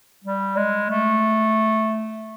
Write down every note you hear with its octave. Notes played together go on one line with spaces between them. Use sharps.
G3
G#3
A3